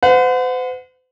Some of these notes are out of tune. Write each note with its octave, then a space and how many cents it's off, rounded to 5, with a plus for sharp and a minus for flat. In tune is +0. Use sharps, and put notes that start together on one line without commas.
C5 -45 F#5 -25